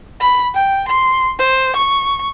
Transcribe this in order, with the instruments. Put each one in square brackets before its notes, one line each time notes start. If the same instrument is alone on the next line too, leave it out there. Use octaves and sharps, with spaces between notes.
[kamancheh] B5
G5
C6
C5
C#6